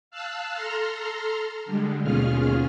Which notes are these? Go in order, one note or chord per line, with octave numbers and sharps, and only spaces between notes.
F5 A5 E6 F#6
A4 A#5 C6 F6
D3 G3 G#3
D#2 B2 C#4 F4 G#4 F6